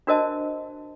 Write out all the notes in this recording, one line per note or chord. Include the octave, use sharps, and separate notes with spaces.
D4 F#4 A#4 C5 D#5 A5